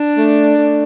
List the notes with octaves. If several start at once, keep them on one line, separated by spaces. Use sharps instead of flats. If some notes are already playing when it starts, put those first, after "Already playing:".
Already playing: D4
A3
A3